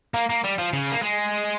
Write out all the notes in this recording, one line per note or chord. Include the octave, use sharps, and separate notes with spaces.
A#3
A#3
G3
F3
C#3
A#3
G#3